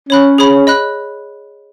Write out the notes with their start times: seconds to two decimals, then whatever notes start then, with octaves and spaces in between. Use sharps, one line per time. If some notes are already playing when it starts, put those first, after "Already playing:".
0.09 C#4 C#5 B5 F#6
0.38 G#4 C#5 B5
0.67 D#5 B5 F#6